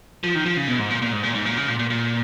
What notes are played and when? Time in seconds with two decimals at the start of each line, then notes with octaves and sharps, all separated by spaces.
0.24 F3
0.35 D#3
0.46 F3
0.57 C#3
0.68 B2
0.79 G#2
0.90 A#2
1.02 A#2
1.13 G#2
1.23 A#2
1.35 G#2
1.46 A#2
1.57 C#3
1.68 A#2
1.79 A#2
1.90 A#2